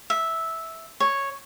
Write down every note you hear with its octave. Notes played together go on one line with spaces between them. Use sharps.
E5
C#5